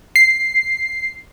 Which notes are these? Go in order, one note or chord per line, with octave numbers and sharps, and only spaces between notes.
C7